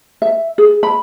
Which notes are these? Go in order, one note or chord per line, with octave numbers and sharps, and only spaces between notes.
E5
G#4
B5